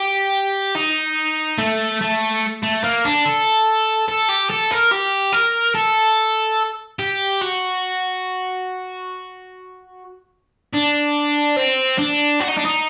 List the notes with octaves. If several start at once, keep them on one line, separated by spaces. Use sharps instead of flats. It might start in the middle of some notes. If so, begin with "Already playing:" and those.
Already playing: G4
D#4
A3
A3
A3
A#3
D4
A4
A4
G4
A4
A#4
G4
A#4
A4
G4
F#4
D4
C4
D4
F#4
D#4
D4
D#4